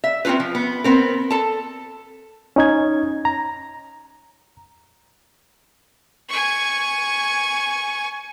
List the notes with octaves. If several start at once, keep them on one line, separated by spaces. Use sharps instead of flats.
E5
C4 C#4 D#4 F4 B4
F3
B3
B3 C4 A#4
A4 A5
C#4 D#4 G#6
A#5
G#5 C#6